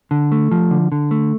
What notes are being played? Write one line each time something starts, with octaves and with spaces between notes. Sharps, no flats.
D3
A3
F3
D3
D3
A3